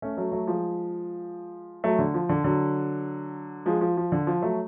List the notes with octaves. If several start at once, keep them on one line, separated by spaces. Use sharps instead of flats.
A3 C#4
F#3 A3
F#3 A3
F3 G#3
F#3 A3
D3
F3
D3
D3 F#3
F3 G#3
F3
F3
D3
F3
F#3 A3